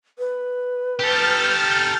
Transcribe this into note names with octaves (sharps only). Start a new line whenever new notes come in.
B4
G4 A4 F6 G6 A6